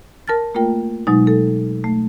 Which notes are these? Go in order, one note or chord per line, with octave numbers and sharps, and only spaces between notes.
A#4 A5 F6 A6
A3 A#3 F4 A#4 G5
B2 F#3 G#3 D#4
A4
A3